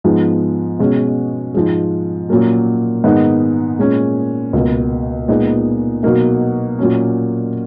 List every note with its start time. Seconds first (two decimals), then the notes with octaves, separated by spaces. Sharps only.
0.04 G#2 F3 G#3 B3
0.79 B2 G#3 C#4
1.54 G#2 F3 G#3
2.29 A#2 F#3 A#3 C#4
3.04 G#2 D#3 G#3 B3 D#4
3.79 A#2 G#3 C#4
4.53 C#2 B2 A#3
5.28 A#2 G#3 B3 D#4
6.03 B2 F#3 A#3 D#4
6.79 A#2 F#3 C#4